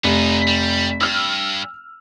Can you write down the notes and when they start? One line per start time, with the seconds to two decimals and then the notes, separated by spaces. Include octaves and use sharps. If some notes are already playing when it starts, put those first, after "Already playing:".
0.04 F1 B3 D#4
0.47 G3
1.01 G2 E6 F6